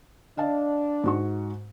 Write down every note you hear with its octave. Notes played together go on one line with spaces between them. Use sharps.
D4 D#5 F5 A5
G#2 F#4 C#6